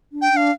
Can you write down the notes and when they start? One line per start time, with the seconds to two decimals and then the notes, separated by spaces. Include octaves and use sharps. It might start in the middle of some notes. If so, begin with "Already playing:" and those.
0.12 D4
0.22 G5
0.33 D4 F5